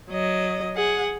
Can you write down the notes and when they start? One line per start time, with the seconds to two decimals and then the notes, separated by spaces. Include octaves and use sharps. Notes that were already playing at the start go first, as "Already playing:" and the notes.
0.11 F#3 D#5
0.76 G#4 F#5